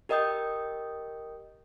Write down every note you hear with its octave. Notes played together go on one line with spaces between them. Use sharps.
G4 A#4 D#5 G5 D#6 G6